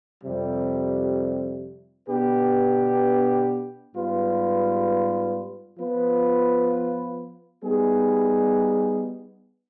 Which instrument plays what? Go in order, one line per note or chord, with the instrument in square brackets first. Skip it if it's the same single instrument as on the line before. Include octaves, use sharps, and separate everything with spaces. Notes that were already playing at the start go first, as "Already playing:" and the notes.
[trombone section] F2 C3 G3
B2 B3 D4 G4 B4
G#2 G3 B3 F4 B4
F3 B3 F4 B4
G3 B3 D#4 G#4